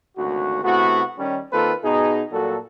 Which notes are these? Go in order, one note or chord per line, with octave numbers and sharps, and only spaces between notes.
G#1 D2 C#3 F#4
C3 A3 B3 E4 F#4
D#3 G3 C#4
D#3 A#3 C4 F4 A4 B4
B2 D#4 G#4
A#2 F#3 G3 F#4 A4